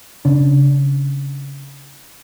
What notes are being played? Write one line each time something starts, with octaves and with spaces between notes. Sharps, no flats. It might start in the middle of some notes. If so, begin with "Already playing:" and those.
C#3 D4